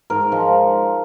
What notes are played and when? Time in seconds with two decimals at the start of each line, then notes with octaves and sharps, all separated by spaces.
0.10 G#2 A#4
0.32 F3 G#3